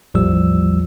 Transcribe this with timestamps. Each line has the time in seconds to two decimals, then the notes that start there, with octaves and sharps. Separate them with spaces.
0.14 A1 E2 A2 F3 G3 E6